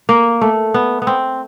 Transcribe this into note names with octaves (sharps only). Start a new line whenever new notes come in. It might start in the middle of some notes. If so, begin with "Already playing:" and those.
A#3
A3
B3
B3
C4